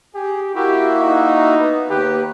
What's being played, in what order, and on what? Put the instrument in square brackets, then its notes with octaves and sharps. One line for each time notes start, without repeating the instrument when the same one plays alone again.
[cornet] G4 [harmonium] G#4
[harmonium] A#3 E4 F#4 [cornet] G4
[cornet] D#4
[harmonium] B3
[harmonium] D#2 D#3 B4 [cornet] G4